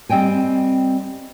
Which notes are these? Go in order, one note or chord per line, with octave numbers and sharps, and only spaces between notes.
G3 C4 D#5 G5 G#5